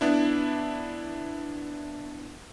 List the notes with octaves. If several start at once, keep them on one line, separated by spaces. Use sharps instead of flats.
B3 D4 E4